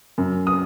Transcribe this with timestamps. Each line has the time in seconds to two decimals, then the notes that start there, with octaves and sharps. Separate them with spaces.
0.18 F#2
0.47 D#6